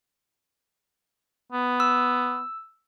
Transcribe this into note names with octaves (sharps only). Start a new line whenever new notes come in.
B3
E6